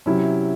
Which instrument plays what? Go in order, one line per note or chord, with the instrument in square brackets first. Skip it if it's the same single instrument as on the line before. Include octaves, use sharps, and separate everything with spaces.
[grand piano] C3 F#3 C#4 E4